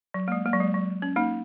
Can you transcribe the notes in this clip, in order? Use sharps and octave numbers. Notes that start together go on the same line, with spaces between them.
F#3
A#3
G#3
A#3
F#3
G#3
F#3
C#4
A#3 D#4